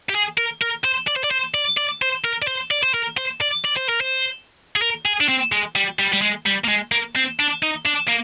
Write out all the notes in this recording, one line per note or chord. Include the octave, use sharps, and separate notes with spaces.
G4
G#4
A#4
A#4
C5
D5
C5
D5
C5
D5
D5
C5
A#4
D5
C5
D5
C5
A#4
C5
D5
D5
C5
A#4
C5
G#4
A#4
G#4
D4
C4
G#3
G3
G3
G3
G#3
G3
A#3
G#3
A#3
C4
D4
D#4
D4
A#3